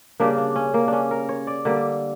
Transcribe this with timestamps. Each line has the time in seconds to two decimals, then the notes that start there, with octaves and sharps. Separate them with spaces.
0.20 C#3 G3 A#3 D4
0.38 D4
0.56 C#4
0.74 A#3
0.88 C#4 D4
1.11 A#4
1.29 C#5
1.47 D5
1.65 D3 G3 A#3